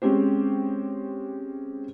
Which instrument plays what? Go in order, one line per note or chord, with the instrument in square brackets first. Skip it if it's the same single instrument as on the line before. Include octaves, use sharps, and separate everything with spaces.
[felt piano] G#3 C4 C#4 G4 C5